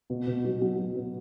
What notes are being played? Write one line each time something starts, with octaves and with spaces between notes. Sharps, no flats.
B2
B2
F#3
F#3
F#3
B3